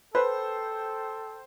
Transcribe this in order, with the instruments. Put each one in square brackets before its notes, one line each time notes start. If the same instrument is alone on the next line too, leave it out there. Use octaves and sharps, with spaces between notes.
[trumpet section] A4 G5 [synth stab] B4 [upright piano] C5